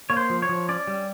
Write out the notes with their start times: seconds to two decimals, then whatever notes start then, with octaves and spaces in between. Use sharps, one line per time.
0.10 A#3 C#5
0.17 C5
0.30 F3
0.42 C#5
0.49 F3
0.68 C#4 D5
0.87 G3